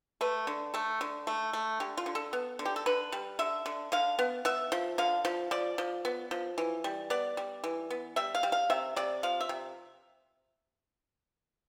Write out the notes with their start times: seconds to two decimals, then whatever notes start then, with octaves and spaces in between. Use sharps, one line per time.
0.21 A3 B4
0.47 D3
0.74 A3 A4
1.01 D3
1.27 A3
1.53 A3
1.80 D3 G4
1.97 F4
2.06 D3
2.15 A4
2.33 B3
2.59 D3
2.65 G4
2.76 A4
2.86 D3 B4
3.12 G3
3.39 D3 E5
3.66 D3
3.92 D3 F5
4.19 B3
4.45 B3 E5
4.72 F3
4.98 D3 F5
5.25 F3
5.51 F3 D5
5.78 F3
6.05 B3
6.31 F3
6.58 E3
6.84 G3
7.10 B3 D5
7.37 G3
7.64 E3
7.90 B3
8.16 G3 E5
8.35 F5
8.43 G3
8.52 F5
8.70 C3 E5
8.96 C3 D5
9.23 F3 F5
9.40 E5
9.49 C3